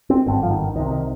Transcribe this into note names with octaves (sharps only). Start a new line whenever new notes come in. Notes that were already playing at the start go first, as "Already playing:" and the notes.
C4
G#1 G2 D3 C4
F3
D#3
C2 C3 D#3
D#3